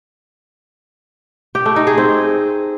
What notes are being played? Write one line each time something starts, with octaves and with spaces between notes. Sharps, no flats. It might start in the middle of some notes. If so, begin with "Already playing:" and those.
G4
A3
D#4
G#4
C4